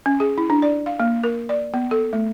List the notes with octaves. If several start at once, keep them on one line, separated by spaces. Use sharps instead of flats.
C#4
G#4
E4
D4
D5
F5
A#3
A#4
D5
B3
A4
A3